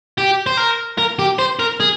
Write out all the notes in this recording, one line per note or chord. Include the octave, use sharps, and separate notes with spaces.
G4
C5
A#4
A#4
G4
C5
A#4
G#4